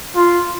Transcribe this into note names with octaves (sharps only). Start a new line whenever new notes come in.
F4